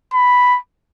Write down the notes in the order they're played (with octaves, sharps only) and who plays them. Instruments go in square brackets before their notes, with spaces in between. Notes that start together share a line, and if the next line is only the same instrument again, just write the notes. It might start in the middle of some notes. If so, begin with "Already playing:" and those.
[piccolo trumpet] B5